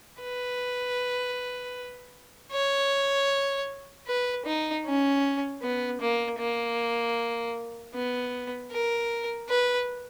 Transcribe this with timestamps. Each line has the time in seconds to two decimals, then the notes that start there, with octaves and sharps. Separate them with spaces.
0.20 B4
2.51 C#5
4.07 B4
4.45 D#4
4.85 C#4
5.62 B3
6.01 A#3
6.39 A#3
7.95 B3
8.71 A#4
9.49 B4